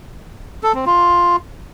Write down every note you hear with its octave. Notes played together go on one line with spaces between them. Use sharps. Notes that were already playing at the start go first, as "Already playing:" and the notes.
A4
C4
F4